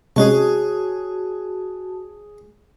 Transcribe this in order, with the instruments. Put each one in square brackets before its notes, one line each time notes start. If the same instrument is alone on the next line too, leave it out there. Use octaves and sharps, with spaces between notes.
[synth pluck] C3 G#3 C#4 [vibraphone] F#4 A5 [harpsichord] G#4 C#5